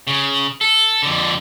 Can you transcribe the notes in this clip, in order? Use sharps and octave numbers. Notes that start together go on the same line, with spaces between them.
C#3
A4
F2 D3